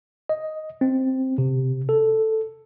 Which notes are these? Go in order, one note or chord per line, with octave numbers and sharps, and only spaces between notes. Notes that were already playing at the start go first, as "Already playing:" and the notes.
D#5
C4
C3
A4